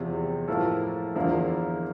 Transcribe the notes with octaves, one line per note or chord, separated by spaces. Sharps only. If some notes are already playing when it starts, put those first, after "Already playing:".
Already playing: E2 C3 F3
A2 F3 A#3 E4 A4
E2 D3 F3 A#3 E4